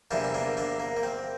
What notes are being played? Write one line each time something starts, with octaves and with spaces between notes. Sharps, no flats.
E2 C3 E3 G3 A#3 D4
E4
A#3 D4
A#3 D4
A#3
A#3
C4